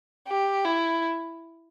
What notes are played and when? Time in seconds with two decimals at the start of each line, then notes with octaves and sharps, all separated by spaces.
0.27 G4
0.65 E4